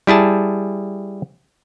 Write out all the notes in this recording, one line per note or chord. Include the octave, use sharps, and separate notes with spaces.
G3 E4 G#4 A5